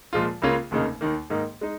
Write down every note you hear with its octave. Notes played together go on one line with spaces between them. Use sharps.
A#2 F3 G#3 F4
C#2 C#3 A#3 C#4 F4
F1 D#2 C#3 A#3 D#4
D#2 D#3 A#3
G#2 D#3 A#3 D#4
G#3 D#4